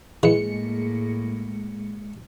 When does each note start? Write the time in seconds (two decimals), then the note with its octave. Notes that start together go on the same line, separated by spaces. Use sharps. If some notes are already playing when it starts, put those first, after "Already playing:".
0.23 A2 E3 G#3 A#3 C#7